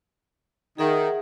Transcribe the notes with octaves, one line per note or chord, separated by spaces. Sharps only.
D#3 G#4 E5 F#5